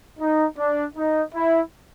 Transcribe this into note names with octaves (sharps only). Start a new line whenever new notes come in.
D#4
D4
D#4
E4